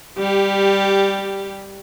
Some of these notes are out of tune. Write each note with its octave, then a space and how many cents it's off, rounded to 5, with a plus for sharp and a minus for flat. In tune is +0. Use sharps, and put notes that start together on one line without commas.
G3 +10 G4 -5